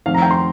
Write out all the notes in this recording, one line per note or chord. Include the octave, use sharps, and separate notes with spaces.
F1 F2 D#3 F5
A#5
G5
C6